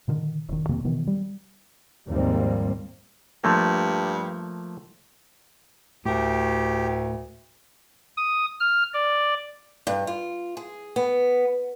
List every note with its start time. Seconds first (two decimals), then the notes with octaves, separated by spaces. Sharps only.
0.08 A#2 D3 D#3
0.49 E1 D#3
0.69 F2 C3 A#3
0.85 B2 D#3 E3 B3
1.07 G3
2.09 D#2 G#2 F3 G3 A#3 C4
3.44 G2 F3 A3 A#3
6.06 D2 A2 G4 A#4
8.17 D#6
8.60 F6
8.94 D5
9.87 G2
10.07 F4
10.57 G#4
10.96 B3